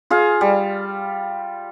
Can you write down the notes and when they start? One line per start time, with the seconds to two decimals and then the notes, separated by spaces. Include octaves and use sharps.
0.10 F4 G#4 F5
0.41 G3